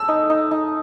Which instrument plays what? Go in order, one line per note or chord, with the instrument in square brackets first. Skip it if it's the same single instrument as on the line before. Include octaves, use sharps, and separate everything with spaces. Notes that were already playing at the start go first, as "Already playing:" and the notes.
Already playing: [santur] A4 [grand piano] E6
[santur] D#4
D#4
D#4